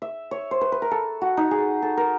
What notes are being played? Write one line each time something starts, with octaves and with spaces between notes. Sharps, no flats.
E5
C#5
C5
B4
B4
A#4
A4
F#4
D#4
G#4
A4
A#4